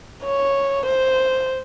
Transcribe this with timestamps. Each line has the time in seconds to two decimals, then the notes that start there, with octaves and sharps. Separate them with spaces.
0.25 C#5
0.86 C5